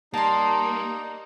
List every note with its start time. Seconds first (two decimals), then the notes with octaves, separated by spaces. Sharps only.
0.14 G3 A#3 D#4 A5 C6